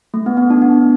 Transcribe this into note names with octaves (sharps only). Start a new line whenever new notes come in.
A3
B3
B3
D4
B3